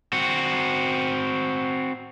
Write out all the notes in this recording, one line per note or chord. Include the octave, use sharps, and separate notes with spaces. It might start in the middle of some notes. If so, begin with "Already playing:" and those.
C4 F#4